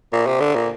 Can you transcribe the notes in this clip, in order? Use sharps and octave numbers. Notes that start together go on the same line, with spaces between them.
A#2
C3
D3
A#2